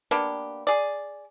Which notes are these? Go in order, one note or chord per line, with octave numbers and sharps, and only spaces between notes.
A#3 B3 D4 G4
G#4 D5